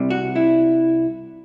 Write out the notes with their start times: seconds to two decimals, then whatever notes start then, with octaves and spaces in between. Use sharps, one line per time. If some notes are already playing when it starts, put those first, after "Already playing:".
Already playing: C2 C3 G3
0.10 F#4
0.36 E4